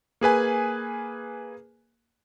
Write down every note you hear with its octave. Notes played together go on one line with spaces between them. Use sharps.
A#3 G#4 B4 G#5